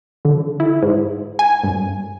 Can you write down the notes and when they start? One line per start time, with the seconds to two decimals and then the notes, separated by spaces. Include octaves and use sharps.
0.25 D3
0.60 E4
0.83 G#2
1.39 G#5
1.64 G2